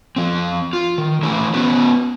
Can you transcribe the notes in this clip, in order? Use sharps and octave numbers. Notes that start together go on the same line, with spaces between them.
F3 C4
F4
D#3
E3 A3 E4 G4
B3 C#4 F#4 B4